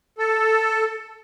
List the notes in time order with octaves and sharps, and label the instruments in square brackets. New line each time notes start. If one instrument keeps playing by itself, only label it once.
[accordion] A4